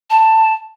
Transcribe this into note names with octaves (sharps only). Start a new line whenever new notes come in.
A5